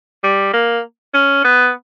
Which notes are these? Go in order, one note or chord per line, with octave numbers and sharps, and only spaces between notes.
G3
A#3
C#4
B3